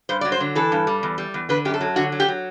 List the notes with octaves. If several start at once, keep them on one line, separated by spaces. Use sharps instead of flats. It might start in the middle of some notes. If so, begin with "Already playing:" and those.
G2 C5
F#3 D5
C5
D3
E3 A4
G2
G3
E2
G3
E2
D3 B4
F#2 G4
A4
F#3
D3 F#4
F#3
G4
F#3